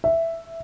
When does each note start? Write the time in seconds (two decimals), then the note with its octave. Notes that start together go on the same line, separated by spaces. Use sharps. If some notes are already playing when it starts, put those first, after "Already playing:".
0.04 E5